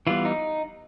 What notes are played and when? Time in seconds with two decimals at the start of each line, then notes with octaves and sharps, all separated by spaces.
0.07 E3 G3 B3 F4
0.25 D#4